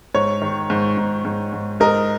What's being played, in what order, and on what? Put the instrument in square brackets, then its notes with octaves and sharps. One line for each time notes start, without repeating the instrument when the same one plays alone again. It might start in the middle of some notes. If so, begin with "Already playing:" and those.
[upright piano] G#2 C#5
D#3
G#2
G#2
G#2
G#2
G#2 A#4 D#5